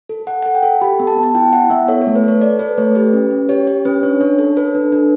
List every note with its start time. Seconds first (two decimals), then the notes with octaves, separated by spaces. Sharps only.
0.09 A4
0.27 A4 F#5
0.43 A4 F#5
0.55 G5
0.63 A4
0.82 G4 B5
1.00 B3
1.07 A5
1.17 B3
1.23 A5
1.35 E4 G5
1.53 E4 F#5
1.70 B3 E5
1.88 A4 C#5
2.01 C#5
2.07 A3
2.16 B4
2.24 A4 C#5
2.41 A4 D5
2.59 A4 B4
2.78 A3 C#5
2.95 G4 B4
3.13 C#4
3.31 C#4
3.49 G4 C#5
3.67 G4 C#5
3.85 C#4 B4
4.03 D4 C#5
4.21 D4 C#5
4.38 A4 C#5
4.57 A4 B4
4.75 D4
4.92 D4